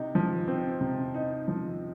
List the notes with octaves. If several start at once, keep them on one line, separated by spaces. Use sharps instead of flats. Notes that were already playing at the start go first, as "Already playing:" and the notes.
Already playing: C3 D#4
F3
C4
C3
D#4
F3